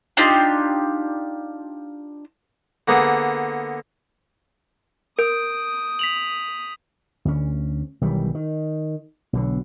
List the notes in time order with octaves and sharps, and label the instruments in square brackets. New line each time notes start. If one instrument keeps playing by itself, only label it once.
[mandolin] D4 D#4 F4 G4
[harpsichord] D3 A#3 B3 G#4
[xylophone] A#4 [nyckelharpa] D#6 [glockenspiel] G6 D7
[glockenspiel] B6 F7 F#7
[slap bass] D2 C#4
B1 D#3 E3 G3
D#3
B1 B2 D3